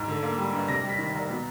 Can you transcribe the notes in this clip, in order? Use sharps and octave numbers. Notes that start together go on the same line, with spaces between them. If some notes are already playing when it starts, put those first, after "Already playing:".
Already playing: G#2
D3
A#3
G3
G2
C3 A#6
G3
B6
D#3
C2
B2